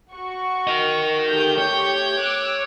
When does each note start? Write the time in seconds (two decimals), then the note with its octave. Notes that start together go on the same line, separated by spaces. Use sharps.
0.14 F#4 C#6
0.67 A#4 D#5
1.23 A3 G4 G6
1.58 C#5
2.19 D6 E6 F#6